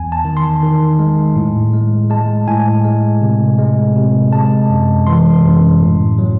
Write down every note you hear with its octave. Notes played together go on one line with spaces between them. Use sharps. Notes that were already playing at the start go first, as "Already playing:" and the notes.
Already playing: E2 G#5
A5
D#3
C6
D#3
G#3
A2
G#3
G#3 A5
A2 G#5
G#3
C3
G#3
C3
G#3 A5
F#2
E3 C6
F#2
A2
F#3